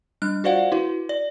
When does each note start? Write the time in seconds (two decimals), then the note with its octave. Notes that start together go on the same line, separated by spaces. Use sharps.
0.22 G3 D4 F6 F#6
0.44 F4 F#4 C5 D5 F5 F#5
0.72 E4 F#4 B4
1.09 D5